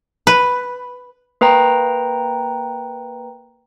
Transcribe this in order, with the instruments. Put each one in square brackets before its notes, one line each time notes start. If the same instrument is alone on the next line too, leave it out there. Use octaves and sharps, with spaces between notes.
[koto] B4
[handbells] A#3 B4 G5 A#5